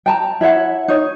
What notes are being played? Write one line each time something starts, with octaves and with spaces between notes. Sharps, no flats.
G5 A5 A#5
E4 C#5 E5 F#5
D#4 C#5